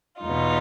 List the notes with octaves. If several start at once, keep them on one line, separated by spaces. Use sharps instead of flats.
E2 B2 D#4 F4